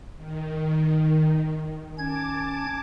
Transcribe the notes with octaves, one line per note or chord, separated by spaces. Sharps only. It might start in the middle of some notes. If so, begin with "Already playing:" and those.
D#3
C#4 A5 D6 G#6